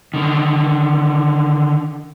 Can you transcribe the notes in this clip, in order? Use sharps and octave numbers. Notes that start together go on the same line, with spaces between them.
D3 D#3